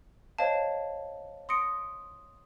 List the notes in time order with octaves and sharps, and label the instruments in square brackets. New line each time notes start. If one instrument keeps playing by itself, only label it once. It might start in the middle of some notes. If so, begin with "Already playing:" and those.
[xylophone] C5 C#5 D#5 F5 A5
C6 D#6 A#6 C#7 D7